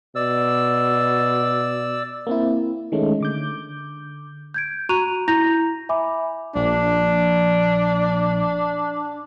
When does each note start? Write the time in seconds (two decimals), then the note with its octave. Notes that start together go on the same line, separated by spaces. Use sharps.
0.15 B2 D5 E6
2.27 A#3 C4 E4
2.92 D#3 G#3 A3 C#4
3.20 D3 D6 G6
4.54 G6 G#6 D7
4.89 F#4 A#5 C#6 F#6 D#7 F7
5.28 E4 A#5 G6 A#6 F7
5.89 E5 G#5 B5 D6
6.55 A#1 D4